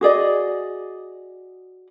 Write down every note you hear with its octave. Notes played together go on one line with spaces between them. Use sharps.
F#4 G#4 D5 D#5